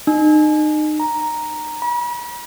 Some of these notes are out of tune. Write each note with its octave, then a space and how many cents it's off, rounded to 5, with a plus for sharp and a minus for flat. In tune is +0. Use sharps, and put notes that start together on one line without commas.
D#4 -30
A#5 +5
B5 -45